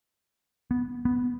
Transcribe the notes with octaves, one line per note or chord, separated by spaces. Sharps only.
B3
B3